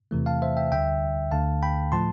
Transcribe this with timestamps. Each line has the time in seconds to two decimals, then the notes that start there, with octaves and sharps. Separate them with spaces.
0.11 E2 C3 E3 A3
0.26 F5 A5
0.42 C5 E5
0.57 E5 G5
0.72 D2 D3 G3 E5 G5
1.31 D2 D3 A3 F5 A5
1.63 G5 B5
1.92 A2 F3 A3 A5 C6